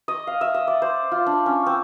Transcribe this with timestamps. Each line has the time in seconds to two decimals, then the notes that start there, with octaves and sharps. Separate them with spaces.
0.08 D#5
0.27 F5
0.41 E5
0.54 D#5
0.67 D5
0.82 C5
1.11 F4
1.26 D4
1.46 C#4
1.66 C4